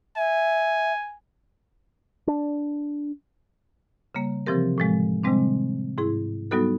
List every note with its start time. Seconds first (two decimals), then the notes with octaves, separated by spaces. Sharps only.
0.17 E5 G#5
2.27 D4
4.15 C#3 G3 A#3
4.46 C3 E3 F3 C4 G4 A#4
4.78 A2 F3 G#3
5.24 C3 D#3 G3 G#3 C4 D4
5.98 G#2 E4 G#4
6.51 F#3 G3 B3 D#4 F#4 A4